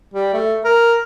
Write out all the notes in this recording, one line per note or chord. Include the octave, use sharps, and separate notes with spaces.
G3
A3
A#4